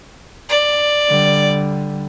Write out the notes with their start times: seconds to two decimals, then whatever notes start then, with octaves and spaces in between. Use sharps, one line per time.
0.49 D5
1.10 D3 G3